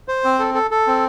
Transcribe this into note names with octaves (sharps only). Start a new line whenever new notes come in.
C5
C4
A4
A4
A4
C4